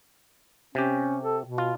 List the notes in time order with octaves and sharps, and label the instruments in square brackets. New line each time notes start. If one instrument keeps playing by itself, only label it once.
[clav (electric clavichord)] C3 G4 [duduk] C#4
[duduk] A4
B2
[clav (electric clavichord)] F4